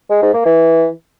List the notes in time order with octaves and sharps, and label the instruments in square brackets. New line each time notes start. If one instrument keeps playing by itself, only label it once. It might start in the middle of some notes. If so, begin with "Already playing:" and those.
[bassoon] G#3
G#2
A#3
E3